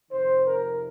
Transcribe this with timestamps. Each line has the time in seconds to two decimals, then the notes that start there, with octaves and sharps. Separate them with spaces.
0.11 F2 C3 D#3 C5
0.45 A#4